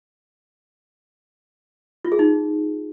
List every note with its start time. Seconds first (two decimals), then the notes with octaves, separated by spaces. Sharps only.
2.04 F4
2.12 G#4
2.19 D#4